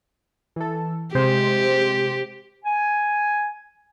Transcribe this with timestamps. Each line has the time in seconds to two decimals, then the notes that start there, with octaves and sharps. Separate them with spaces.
0.56 E3 A4
1.15 C3 G#3 G4 C5
2.65 G#5